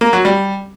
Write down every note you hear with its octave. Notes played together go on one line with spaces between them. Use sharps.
A#3
F#3
G3